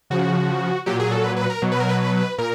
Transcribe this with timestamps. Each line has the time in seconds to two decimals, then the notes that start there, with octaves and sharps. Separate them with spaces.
0.10 C#3 F3 F#4
0.86 A#2 F#3 G4
1.00 G#4
1.12 A4
1.24 B4
1.36 B4
1.50 A#4
1.62 B2 F#3
1.72 B4
1.80 A#4
1.89 B4
2.38 A#2 A#4